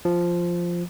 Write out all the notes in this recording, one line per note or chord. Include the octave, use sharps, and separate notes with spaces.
F3